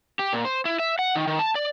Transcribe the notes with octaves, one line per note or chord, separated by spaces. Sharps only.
G4
A#2
C5
E4
E5
F#5
D#3
D#3
A5
D5